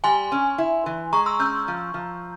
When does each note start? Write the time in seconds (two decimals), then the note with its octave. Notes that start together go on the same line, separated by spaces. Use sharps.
0.04 G3 G#5 C6
0.32 C#4
0.58 E4
0.86 E3
1.13 G#3 A#5 C#6
1.26 C6 E6
1.40 C#4 E6 G6
1.68 F3
1.94 F3